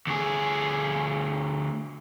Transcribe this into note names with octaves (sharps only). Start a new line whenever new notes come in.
D2 G#4